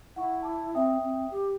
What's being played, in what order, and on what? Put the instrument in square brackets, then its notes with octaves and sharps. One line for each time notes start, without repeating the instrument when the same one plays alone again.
[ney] E4 [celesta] F#5 C#6
[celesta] A5 D6
[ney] C4 [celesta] E5 G5 D#6
[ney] C4
G4